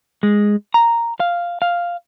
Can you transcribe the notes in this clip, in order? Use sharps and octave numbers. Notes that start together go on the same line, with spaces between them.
G#3
A#5
F5
F5